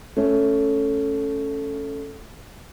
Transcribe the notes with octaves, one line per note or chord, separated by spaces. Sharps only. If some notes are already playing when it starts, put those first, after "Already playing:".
A3 C#4